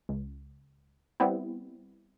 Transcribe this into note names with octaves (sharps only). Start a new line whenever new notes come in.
C#2
G3 B3 C4 E4